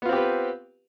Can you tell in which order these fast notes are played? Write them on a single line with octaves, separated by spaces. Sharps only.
B3 F4 C4 G4 B4